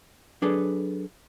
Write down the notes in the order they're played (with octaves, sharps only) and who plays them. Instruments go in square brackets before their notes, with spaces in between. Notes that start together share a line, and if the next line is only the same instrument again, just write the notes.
[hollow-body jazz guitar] F#3 D4 G#4 A4 B4